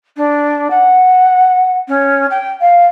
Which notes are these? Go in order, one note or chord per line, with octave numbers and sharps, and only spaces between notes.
D4
F#5
C#4
G5
F5